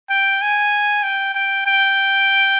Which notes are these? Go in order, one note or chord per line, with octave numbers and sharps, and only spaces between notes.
G5
G#5
G5
G5
G5